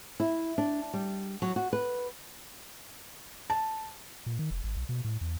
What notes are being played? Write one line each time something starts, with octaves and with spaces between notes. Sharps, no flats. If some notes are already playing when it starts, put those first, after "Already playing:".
E4
D4
G3
F#3
F#4
B4
A5
A#2
D#3
F1
G#1
B1
B2
A2
E2